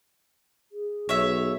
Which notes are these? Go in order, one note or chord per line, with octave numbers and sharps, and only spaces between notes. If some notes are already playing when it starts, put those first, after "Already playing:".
G#4
B1 C#5 E5